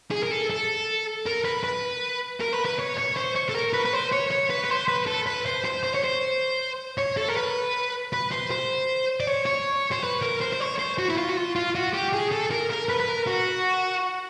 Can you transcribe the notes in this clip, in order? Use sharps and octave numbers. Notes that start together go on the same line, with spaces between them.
G#4
A#4
A4
A4
A#4
B4
B4
A#4
B4
B4
C#5
C#5
C5
C#5
A4
A#4
B4
B4
C5
C#5
C#5
B4
B4
C5
B4
A4
B4
C5
C5
C5
C#5
C5
C#5
A4
A#4
B4
B4
C5
C5
D5
C#5
C#5
C5
B4
A#4
C5
C5
C#5
C5
F#4
E4
F4
F#4
F4
F4
F#4
G4
G#4
A4
A#4
A#4
B4
B4
A#4
F#4